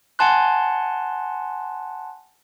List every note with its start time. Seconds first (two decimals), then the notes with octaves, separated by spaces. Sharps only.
0.19 F#5 G#5 A5 C6 F#6